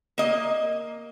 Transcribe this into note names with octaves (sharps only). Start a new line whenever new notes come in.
A#3 D#5